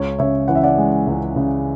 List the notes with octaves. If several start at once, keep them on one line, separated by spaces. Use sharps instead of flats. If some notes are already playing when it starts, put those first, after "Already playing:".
Already playing: C#2 C#5
C#3 C#5 E5
E3 F#5
E5
D5 F#5
G#3
C#2
C#3